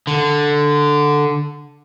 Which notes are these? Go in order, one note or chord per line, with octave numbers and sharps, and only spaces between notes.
D3